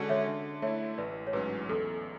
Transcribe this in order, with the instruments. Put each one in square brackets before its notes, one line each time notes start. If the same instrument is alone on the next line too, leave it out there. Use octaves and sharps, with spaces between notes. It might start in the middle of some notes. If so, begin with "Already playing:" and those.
Already playing: [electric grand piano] D3 G#3 C#4 F#4 A4
[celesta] C#5 E5
[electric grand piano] D3
[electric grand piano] A3 E4 [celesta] C#5 E5
[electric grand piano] A1 [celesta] B4 D5
[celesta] C#5
[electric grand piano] G#2 F#3 C#4 [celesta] B4
[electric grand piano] E2 [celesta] A4